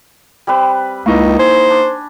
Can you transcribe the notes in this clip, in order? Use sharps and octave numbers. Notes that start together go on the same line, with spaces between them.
G3 C4 B4
C#2 A#3 D#4 E4 C#6
C5 G#5
D4